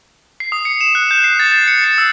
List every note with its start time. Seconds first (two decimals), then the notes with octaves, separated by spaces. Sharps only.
0.40 C7
0.52 D#6
0.65 C#7
0.81 E7
0.95 F#6
1.11 G6
1.24 C7
1.39 A6
1.52 A6
1.67 C#7
1.84 C#7
1.98 E6